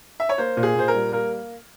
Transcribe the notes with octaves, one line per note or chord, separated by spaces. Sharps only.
E5
C#5
A#3 C5
A#2
G#4
A#2 C5
A#4
G3
A#3 A#4